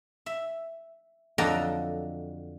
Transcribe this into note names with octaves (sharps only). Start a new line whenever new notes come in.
E5
F2 D3 F#3 A4 D#5 A#5